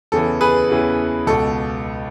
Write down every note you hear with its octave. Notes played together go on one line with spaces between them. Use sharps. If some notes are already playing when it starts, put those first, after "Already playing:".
E2 C#3 E3 A4
G#4 B4
E2 C#3 E3
C#2 B2 A4